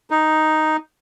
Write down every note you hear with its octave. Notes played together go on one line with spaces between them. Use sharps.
D#4